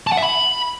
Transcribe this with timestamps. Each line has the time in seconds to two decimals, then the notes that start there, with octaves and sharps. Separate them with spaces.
0.07 A5
0.12 F#5
0.17 E5
0.22 B5